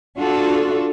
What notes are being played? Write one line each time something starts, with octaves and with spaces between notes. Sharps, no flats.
D4 F4 F#4 A4